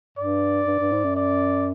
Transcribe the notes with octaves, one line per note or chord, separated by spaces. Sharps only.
G2 D5
G2
G2
G#2
F#2
D5